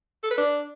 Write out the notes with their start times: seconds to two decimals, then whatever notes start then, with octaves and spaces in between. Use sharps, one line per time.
0.23 A4
0.31 B4
0.38 D4